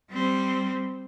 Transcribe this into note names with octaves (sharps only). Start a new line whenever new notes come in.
G3 C4